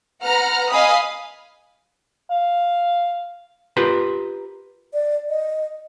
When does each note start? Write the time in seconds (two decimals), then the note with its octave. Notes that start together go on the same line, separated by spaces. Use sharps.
0.22 B4 F#5 A#5 F6
0.70 D#5 F5 G#5 B5 D#6
2.30 F5
3.77 F4 G4 A#4 B4 C6
4.93 D5
5.29 D#5